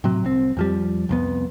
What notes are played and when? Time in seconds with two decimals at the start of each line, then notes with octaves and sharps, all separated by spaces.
0.04 A2 C3 F#3
0.25 C2 C4
0.57 F2 F3 G3
1.09 C2 F2 B3